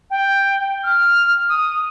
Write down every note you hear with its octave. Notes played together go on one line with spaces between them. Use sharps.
G5
F6
D#6